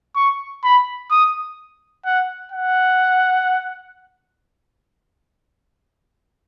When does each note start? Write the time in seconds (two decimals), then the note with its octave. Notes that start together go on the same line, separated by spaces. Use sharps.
0.16 C#6
0.64 B5
1.10 D#6
2.05 F#5
2.51 F#5